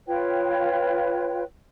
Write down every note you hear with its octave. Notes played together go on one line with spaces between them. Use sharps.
F4 B4 C#5 G5